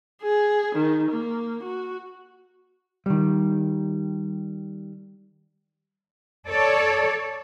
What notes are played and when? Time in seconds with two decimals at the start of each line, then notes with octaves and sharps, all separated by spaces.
0.22 G#4
0.75 D#3
1.11 A#3
1.63 F#4
3.06 D#3 G3
6.48 A4 C#5 D5